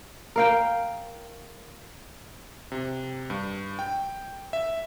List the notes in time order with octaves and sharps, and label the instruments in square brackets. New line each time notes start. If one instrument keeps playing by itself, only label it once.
[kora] A#4 F5 G5
[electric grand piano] C3
G2
G5
E5